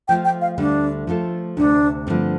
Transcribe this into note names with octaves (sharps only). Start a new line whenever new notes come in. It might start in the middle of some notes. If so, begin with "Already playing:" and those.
F3 A3 F4 G5
G5
F5
D2 D3 G3 D4
F3 A3 F4 A4
D2 C3 A3 D4
G2 D3 F3 A3 C4